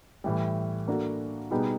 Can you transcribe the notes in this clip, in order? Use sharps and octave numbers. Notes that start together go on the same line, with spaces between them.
A2 E3 G3
A#3 D4 F#4 A4
B2 G3 B3 D#4 G#4